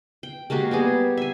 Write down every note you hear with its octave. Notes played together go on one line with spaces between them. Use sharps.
G5
G#3 A#3 F#4 G4
G3 B3 G#4
E5 G#5